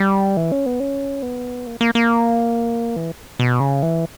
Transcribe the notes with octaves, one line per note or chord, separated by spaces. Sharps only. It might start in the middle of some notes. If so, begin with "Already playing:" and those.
Already playing: G3
E3
C#4
B3
C#4
B3
A#3
A#3
A#3
E3
B2
C#3
E3